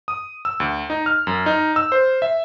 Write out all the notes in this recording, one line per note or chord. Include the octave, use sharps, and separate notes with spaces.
D#6
E6
D2
D#4
F6
F#2
D#4
E6
C5
E5